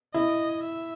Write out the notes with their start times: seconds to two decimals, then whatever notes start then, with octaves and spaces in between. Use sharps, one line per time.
0.14 E4 D#5
0.65 E5